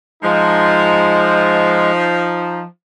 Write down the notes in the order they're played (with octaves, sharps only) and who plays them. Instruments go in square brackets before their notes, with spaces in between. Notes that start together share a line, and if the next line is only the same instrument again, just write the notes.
[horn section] F3 D#4 [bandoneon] G#3